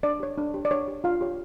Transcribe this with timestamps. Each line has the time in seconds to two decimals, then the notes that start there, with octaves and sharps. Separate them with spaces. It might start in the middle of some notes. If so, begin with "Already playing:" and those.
0.03 D4 D5
0.20 G4 C#5
0.38 D4
0.54 G4 C#5
0.65 D5
0.71 D4 C#5
0.88 G4 C#5
1.04 D4 F4 F5
1.21 G4 C#5